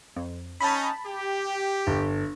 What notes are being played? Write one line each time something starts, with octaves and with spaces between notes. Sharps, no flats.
F2
C#4 D#4 A5 B5
G4
G1